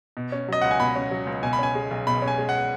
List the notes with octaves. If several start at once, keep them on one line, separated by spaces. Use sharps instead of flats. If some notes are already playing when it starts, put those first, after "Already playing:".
B2
C#4
F#3 D#5
C#2 F#5
G#5
B2 B5
C#4
F#3
C#2
B2 G#5
B5
C#4 G#5
G#3
B1
B2 B5
C#4
G#5
G#3
F#5